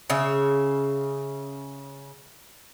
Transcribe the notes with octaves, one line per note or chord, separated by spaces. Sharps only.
C#3 E5